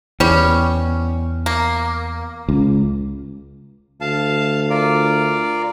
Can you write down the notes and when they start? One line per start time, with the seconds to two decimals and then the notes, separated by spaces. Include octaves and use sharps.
0.20 E2 G3 C#4
1.46 A#3
2.49 C#2
4.01 D2 F5 A5
4.70 F4 A#4 D5